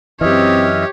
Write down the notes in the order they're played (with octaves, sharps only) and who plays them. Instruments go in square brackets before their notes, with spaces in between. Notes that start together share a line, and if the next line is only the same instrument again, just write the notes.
[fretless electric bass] F#2 E3 [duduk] C4 [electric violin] G4 C#5 [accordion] D#5 E5 F6